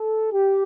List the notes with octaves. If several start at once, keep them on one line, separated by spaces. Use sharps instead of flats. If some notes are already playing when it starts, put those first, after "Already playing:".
Already playing: A4
G4